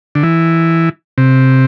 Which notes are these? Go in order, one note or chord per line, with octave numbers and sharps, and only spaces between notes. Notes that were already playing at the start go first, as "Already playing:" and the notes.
D3
E3
C3